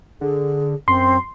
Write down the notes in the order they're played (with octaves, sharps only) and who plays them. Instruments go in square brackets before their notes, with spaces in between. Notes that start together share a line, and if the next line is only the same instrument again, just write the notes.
[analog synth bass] D3 [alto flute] G#4
[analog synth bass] F#2 [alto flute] C4 [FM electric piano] C6